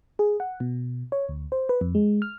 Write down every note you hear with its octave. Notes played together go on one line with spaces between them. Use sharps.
G#4
F#5
B2
C#5
D2
C5
B4
F2
G#3
F6